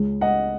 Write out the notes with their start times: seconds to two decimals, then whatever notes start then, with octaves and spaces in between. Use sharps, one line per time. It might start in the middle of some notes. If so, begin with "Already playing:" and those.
Already playing: C#2 C#3 G#3
0.21 D#5 F#5